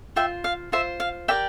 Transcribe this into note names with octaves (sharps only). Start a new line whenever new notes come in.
F4 C5 E5 G5
F5
F4 C5 E5
F5
G4 A#4 D5 E5 G5